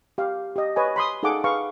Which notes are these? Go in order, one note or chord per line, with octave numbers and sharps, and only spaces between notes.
G4 F5
G4 D#5
B4 C#5 D#5 G#5
B5 C6 D#6
D#4 G#4 A4 F5 F#5 D6
G#4 B4 F5 C#6